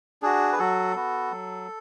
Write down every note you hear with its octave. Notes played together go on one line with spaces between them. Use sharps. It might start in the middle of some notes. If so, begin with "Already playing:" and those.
D4 F#4 G#4
B4
F#3 F#4 A4
B3 F#4
F#3